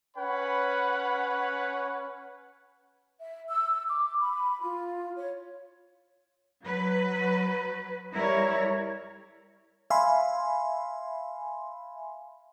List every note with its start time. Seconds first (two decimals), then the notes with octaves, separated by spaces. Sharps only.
0.17 C#4 B4 C#5 F#5 B5
3.20 E5
3.50 E6
3.88 D6
4.18 B5
4.61 F4
5.16 C#5
6.63 F#3 B4
8.13 G3 E4 A#4 C#5
9.90 E5 F5 G#5 B5 C6